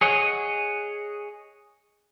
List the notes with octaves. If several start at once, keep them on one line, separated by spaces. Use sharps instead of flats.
G#4 C#5 D#5 F#5